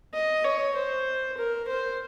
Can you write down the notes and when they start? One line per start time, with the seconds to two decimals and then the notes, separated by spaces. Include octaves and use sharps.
0.14 D#5
0.45 C#5
0.75 C5
1.37 A#4
1.68 C5